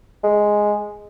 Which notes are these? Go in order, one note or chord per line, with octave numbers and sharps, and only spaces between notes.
G#3